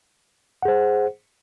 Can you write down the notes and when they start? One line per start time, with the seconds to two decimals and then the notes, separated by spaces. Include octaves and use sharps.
0.62 F#5
0.65 G#4
0.68 C5